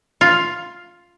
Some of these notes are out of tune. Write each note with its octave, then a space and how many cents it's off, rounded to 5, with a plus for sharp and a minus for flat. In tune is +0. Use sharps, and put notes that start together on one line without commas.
F4 +5